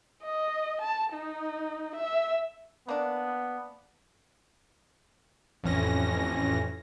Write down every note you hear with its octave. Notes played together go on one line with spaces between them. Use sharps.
D#5
A5
D#4
E5
A#3 B3 D4
A1 F2 E3 C#4 A#6